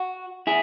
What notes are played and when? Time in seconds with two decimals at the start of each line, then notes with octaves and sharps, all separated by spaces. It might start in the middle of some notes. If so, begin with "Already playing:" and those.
Already playing: F#4
0.47 E4 G#4